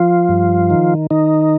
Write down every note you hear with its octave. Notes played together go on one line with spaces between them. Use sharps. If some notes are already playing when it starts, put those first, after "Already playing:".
Already playing: F3 F4
G2
D#3
D#3 D#4